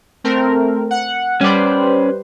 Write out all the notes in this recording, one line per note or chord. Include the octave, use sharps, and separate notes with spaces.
A3 C4 A#4
F#5
G3 C#4 B4 C5 D5